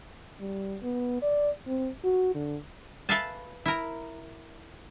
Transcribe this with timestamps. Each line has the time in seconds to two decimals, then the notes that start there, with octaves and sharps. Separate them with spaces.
0.40 G3
0.83 B3
1.22 D5
1.67 C4
2.04 F#4
2.35 D3
3.09 A4 B4 E5 F5 G#5 A5
3.66 E4 A#4